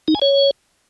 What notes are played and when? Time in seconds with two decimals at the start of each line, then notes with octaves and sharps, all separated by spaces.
0.08 D#4
0.15 G#5
0.22 C#5